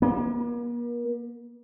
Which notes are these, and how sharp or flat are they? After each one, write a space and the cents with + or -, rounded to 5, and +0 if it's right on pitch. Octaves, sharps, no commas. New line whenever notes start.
A#3 +45